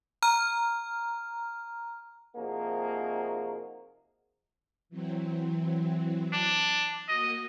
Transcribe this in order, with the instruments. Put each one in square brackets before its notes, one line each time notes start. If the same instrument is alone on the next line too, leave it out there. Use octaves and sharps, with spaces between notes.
[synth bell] A#5 F6
[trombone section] C3 F3 A#3 D#4 F#4 G#4
[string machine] E3 F#3 C4
[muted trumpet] D4
[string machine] A#3 F#4 [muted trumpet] D#5